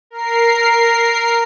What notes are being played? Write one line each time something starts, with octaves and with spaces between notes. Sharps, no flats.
A#4 C7